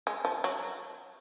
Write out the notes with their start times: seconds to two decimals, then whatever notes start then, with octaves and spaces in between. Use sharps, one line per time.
0.07 G#3
0.25 F3
0.44 F#3